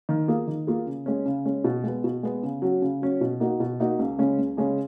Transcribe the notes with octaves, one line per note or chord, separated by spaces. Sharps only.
D#3
A#3 F4 G#4
D#3
A#3 F4 G#4
C#3
G#3 C#4
C#3
G#3 C#4
B2
G#3 B3
B2
G#3 B3
C#3
F#3 C#4
C#3
F#3 C#4
B2
A#3 D#4 F#4
B2
A#3 D#4 F#4
C#2
C#3 G#3 C#4
C#2
C#3 G#3 C#4